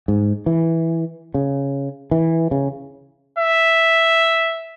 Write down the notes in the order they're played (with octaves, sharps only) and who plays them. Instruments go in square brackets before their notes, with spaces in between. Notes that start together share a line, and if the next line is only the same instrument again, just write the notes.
[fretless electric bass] G#2
E3
C#3
E3
C#3
[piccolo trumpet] E5